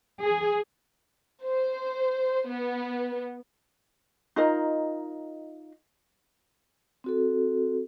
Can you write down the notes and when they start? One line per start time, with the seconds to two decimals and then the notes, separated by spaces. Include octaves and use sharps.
0.23 G#4
1.45 C5
2.50 B3
4.36 D#4 F4 A#4 D#5
7.04 C4 F#4 A4